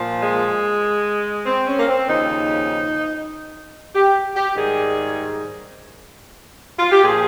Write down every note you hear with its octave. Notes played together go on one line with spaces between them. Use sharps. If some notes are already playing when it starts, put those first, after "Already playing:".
Already playing: A#2 F3
G#3
C4
C#4
A#3
C4
D#2 C#3 F3 D#4
G4
G4
G#2 D#3 G3 G#4
F4
G4
A#2 F3 G#4